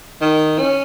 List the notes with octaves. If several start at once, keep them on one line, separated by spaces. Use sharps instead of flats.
D#3
C#4